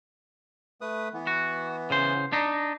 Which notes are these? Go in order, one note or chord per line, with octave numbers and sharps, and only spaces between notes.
A3 B4 D#6
E3 B3
F#4
C#3 C5
D4 D#4